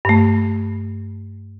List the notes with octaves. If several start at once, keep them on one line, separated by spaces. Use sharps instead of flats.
G2 A3